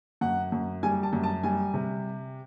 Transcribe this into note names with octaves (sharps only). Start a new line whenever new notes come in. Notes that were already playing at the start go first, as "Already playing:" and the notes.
F#2 F#5
F#2
G3 G#5
A5
F#2
A5
G3 G#5
C3